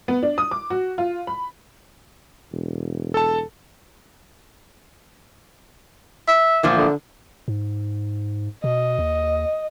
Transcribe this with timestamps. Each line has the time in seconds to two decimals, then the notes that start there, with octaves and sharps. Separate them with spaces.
0.08 B3
0.23 D4
0.38 D#6
0.51 D6
0.70 F#4
0.98 F4
1.27 B5
2.52 E1
3.14 A4 A5
6.28 E5
6.63 E2 A#2 F3
6.76 D3
7.48 G#2
8.64 B2 D#5
8.99 D#2